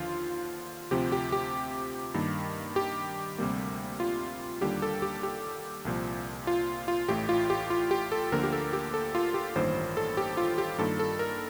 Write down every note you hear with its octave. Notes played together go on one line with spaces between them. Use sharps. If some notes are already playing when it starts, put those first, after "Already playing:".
Already playing: D#2 D3 F3 F4
D2 C3 F3 G4
G4
G4
G2 D#3 A#3
G4
D2 C3 G3 A#3
F4
D#2 D3 G3 A#3 G4
A4
G4
G4
C2 A#2 F3
F4
F4
A1 A2 A3 G4
F4
G4
F4
G4
A4
D2 D3 F3 A#3 A#4
G4
A4
G4
A4
F4
G4
A1 G2 D#3 G3 A#3 C5
A4
G4
F4
G4
G2 D#3 A#3 A4
A4
A#4